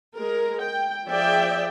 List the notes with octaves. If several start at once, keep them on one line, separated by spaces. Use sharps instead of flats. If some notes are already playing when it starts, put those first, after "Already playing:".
G#3 A#4
G5
F3 G#4 D5 E5 G5